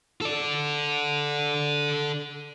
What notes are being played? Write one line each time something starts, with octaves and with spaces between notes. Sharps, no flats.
A4 D5